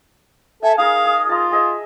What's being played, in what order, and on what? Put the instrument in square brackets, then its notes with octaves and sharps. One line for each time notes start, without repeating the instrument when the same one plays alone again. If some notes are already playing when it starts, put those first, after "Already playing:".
[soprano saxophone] A4 [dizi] E5 [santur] G#5
[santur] D#4 G#4 A#4 [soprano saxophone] F5 [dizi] D#6
[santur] G#4
[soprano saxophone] F4 [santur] A5 A#5
[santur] G#4 D#5 E5